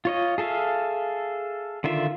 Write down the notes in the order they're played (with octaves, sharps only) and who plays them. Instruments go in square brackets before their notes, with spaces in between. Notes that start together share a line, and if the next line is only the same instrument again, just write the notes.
[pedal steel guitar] F4 C#5 D#5
G#4 A4 E5 F5
D3 D#3 F4 E5 F5